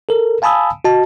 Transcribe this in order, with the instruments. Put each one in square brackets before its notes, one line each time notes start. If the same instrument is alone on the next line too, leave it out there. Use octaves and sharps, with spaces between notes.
[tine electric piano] A4 A#4
F5 G#5 A5 B5 D#6 E6
F#4 D#5 A5